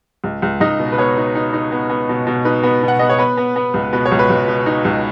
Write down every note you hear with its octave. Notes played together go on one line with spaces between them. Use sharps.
C#2
C#2
C#2 D#4 D#5
B2
B4
B3 C#5
D#4
D#4
D#4
B3
B3
B2
B2
D#4 B4
B3
B2
F#5
B3 D#5
C#5
B3 B4
B3
B3
C#2
B2 B4
C#5
C#2
B4
C#2
B2
D#4
C#2